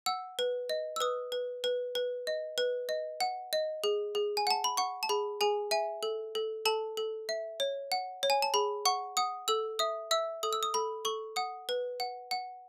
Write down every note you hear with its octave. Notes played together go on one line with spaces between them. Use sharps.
F#5 E6
B4
D#5
E6
B4 D#6
B4
B4
B4
D#5
B4
D#5
F#5
D#5
G#4
G#4
G#5
F#5 A5
B5
F#5 C#6
A5
G#4 B5
G#4 G#5
E5 G#5
A4
A4
A4 A5
A4
E5
C#5
F#5
C#5
G#5
A5
G#4 B5
F#5 C#6
F#5 D#6
A4 E6
E5 D#6
E5 E6
A4 D#6
E6
D#6
A4 B5
A4 C#6
F#5 D#6
B4
F#5
F#5